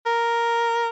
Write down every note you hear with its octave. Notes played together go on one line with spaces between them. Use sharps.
A#4